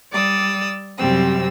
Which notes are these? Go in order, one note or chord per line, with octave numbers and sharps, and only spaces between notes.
G3 D5 D#6 E6
F#2 C3 G3 C4 E6